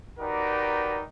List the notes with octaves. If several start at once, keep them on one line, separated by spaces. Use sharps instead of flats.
D#4 F#4 G4 A#4 B4 D5